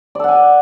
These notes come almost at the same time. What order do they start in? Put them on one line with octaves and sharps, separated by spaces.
D5 A4 F#5 G#5